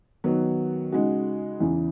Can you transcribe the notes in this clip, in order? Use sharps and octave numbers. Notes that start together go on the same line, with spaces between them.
D#3 F#3 B3
C#3 G#3 D#4 F#4
E2 C#3 E3